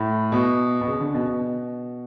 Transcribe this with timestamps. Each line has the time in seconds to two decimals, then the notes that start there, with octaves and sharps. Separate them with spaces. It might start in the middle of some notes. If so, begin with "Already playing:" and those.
Already playing: A2
0.32 B2
0.81 B2
0.87 C#3
1.00 D3
1.14 B2
1.27 B2